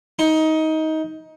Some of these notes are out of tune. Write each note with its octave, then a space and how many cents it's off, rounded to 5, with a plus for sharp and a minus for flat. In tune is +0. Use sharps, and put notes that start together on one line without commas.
D#4 +20